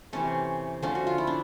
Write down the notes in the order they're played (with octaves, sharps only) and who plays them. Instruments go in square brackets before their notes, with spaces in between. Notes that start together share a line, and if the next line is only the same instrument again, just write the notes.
[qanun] C3 E3 A3 C#4
D3 F3 A3 C#4
F#4
F4
E4
D4